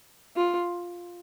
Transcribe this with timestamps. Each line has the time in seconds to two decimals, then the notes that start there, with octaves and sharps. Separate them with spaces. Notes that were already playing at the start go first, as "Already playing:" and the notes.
0.36 F4